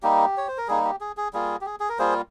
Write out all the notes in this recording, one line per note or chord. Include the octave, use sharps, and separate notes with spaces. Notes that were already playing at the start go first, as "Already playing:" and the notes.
G3 A#3 D#4 G4
C#5
C5
A#4
G3 A#3 D#4 G#4
G4
G#4
G#4
G3 A#3 F4 G#4
G4
G#4
G#4
A#4
G3 A#3 F4 G#4 C5